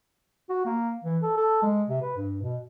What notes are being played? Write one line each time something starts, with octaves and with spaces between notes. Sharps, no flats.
F#4
A#3
E3
A4
A4
G#3
C3
B4
G2
B2